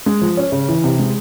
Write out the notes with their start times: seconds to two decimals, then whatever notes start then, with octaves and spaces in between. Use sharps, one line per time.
0.06 G#3
0.21 F3
0.37 C#4
0.52 C#3
0.68 E3
0.84 C3
0.99 G#3